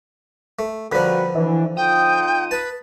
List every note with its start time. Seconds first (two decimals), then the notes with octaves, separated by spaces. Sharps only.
0.59 A3
0.92 D3 F3 G3 A#3 F#4 B4
1.35 B2 E3 D4
1.77 F2 D#4 F4 G5 D#6
2.51 B4 A5